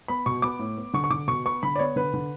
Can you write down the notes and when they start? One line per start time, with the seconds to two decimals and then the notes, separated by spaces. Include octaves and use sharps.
0.08 B3 B5
0.26 B2 C#6
0.42 B3 D6
0.59 A2
0.77 B3
0.94 D3 C#6
1.04 C#6
1.10 D3 D6
1.27 B2 C#6
1.45 B3 C#6
1.63 D3 B5
1.76 D5
1.79 B3 C#5
1.96 D3 B4
2.14 D3